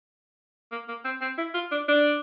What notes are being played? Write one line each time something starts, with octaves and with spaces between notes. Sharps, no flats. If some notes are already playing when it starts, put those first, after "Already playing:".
A#3
A#3
C4
C4
E4
F4
D4
D4